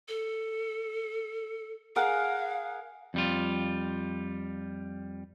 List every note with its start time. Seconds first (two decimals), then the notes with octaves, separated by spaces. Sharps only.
0.08 A4
1.96 G#4 A#4 F5 F#5
3.14 F2 G3 F4